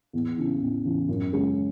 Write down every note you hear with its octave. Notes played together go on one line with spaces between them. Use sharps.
E2
C#3 E3
E2
C#3 E3
F#2
C#3 G#3 C#4